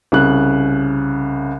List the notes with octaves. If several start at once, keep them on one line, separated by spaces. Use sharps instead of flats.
C2 C#3 F#6